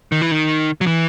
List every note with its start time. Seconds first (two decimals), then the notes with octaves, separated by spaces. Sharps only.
0.12 D#3
0.22 E3
0.31 D#3
0.81 F#3
0.86 E3